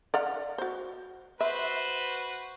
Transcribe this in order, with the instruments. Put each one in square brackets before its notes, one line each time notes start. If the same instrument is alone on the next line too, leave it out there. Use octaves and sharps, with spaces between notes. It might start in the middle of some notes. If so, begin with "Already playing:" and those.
[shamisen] D5 F5 F#5
F#4 C5
[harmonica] F#4 B4 C5 [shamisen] E5